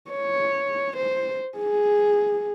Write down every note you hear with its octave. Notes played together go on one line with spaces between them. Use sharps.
C#5
C5
G#4